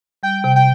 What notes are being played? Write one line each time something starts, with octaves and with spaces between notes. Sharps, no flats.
G3 G5
C3
G5